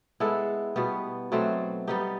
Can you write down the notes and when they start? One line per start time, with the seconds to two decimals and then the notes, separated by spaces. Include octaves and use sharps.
0.20 G#3 B3 E4 A4
0.76 B2 G3 B3
1.32 B2 F#3 A3 C4
1.87 G3 B3 D#4 G4